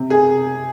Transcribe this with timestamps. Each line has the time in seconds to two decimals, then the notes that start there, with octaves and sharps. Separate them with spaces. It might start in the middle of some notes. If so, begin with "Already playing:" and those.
Already playing: C3
0.10 G#4